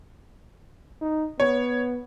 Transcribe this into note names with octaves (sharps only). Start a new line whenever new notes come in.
D#4
B3 C#5